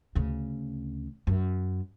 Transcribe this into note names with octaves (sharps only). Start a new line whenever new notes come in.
D2 C#3
F#2